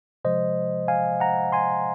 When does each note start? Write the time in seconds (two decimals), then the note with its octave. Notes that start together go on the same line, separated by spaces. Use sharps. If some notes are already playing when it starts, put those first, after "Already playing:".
0.25 C3 F3 G#3 C5 D#5
0.88 F5 G#5
1.20 F#5 A#5
1.52 G#5 C6